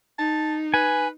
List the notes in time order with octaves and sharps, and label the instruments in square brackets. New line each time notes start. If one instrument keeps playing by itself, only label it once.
[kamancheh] D#4 [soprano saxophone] A5
[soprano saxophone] B4 [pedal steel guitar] G#5